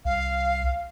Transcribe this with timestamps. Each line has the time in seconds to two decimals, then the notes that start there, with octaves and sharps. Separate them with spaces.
0.05 C2 F5